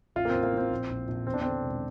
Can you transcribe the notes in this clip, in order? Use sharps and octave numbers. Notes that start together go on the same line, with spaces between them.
A1 F4
A#3
C4
A1
A#3
E3 C4
A#1
A#1
A#1
E2 C4
D4
D3 C4
E1